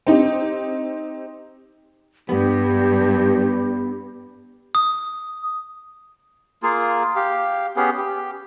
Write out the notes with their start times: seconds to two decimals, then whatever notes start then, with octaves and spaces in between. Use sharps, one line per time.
0.07 C4 D#4 G4
2.29 G2 B3 G4
4.75 D#6
6.63 A#3 F4 G#4
7.16 G4 F5
7.76 B3 C#4 G4 G#4
7.98 G4